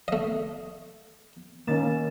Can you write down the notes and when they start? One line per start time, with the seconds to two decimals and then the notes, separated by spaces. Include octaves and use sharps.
0.08 A3 D#5
1.67 D#3 A#3 C#4 A6 E7